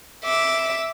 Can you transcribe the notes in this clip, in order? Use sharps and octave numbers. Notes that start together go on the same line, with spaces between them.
E5 D6